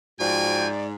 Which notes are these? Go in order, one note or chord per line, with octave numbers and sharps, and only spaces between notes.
G#2 F3 F#4 D5 G5 G#5